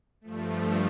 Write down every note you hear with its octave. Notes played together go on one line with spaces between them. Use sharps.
G2 F3 A3